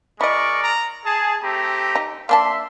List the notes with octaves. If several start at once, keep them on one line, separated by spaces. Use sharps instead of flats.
G#3 E4 A#4 D5 D#5 C#6
A#5
G#4 A5
A3 C4 G4 A#5
D#4
A#3 D4 E5 A5 C6